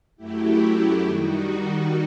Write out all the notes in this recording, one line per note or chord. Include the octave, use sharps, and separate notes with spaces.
F#2 F#3 A3 E4 G4
D#3 G3 D#4 F#4